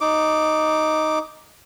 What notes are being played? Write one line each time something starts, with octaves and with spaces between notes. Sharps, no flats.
D#4 D6